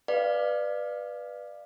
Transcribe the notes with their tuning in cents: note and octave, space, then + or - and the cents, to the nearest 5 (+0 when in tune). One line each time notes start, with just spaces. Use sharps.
B4 +0 D5 +20 F5 -15